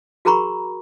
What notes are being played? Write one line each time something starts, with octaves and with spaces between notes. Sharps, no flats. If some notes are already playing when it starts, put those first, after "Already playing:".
F#4 G#4 A#4 A#5 B5 C#6